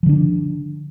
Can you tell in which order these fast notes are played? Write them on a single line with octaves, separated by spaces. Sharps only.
F3 D3 D4